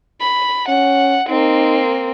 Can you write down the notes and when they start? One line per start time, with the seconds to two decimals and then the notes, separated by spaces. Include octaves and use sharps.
0.21 B5
0.69 C#4 F#5
1.29 A#3 C4 D#4